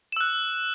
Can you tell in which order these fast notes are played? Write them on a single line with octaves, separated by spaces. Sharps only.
E7 E6 F#6